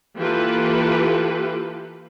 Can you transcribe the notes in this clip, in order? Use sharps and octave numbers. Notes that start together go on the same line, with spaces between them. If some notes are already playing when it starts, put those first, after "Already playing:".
E3 A#3 F4 G4 A4 B4